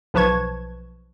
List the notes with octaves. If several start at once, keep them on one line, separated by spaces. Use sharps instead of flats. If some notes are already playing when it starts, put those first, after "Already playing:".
B1 F3 B4 A5 C#6 G#6